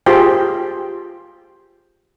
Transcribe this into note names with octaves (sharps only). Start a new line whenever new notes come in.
F4 G4 G#4 C5 G5